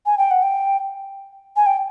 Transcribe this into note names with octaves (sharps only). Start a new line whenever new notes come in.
G#5
G5
F#5
G5
G#5
G5